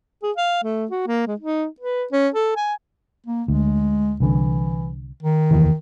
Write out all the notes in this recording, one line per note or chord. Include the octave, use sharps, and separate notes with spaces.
G#4
F5
A3
F#4
A#3
G#3
D#4
B4
C#4
A4
G#5
A#3
D2 G#3
C2 D3 E3
D#3
F1 D#2 E3